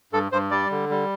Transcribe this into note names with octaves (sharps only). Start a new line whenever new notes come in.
G2 A4
G2 C5
G3 D5
D3
G3